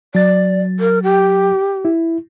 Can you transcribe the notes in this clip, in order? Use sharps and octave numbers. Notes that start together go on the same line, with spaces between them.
F#3 D5 A6
A#4
G4
E4